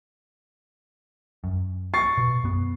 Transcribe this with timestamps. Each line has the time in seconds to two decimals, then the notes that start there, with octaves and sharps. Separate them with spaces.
1.44 F#2
1.94 C#6 A6 C7
2.17 B2
2.43 F#2 B3